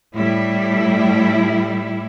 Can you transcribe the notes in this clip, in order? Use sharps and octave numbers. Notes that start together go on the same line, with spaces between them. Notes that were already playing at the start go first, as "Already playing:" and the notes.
A2 G3 E4